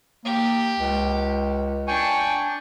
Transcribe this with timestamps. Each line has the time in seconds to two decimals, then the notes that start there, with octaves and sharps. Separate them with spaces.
0.25 A#3 G4
0.80 C#2
1.88 D4 G5 G#5 C#6